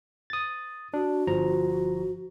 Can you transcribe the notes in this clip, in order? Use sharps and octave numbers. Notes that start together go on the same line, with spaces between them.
D#6 A6
D4 F#4
G1 F3 A#5